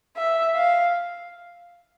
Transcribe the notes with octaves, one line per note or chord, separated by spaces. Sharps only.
E5
F5